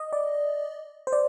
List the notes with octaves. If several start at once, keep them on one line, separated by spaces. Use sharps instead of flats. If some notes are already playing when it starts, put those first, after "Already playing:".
Already playing: D#5
D5
C5
D5